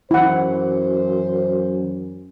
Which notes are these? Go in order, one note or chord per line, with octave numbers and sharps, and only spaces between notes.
F#2 E3 F#3 E4 C5 F#5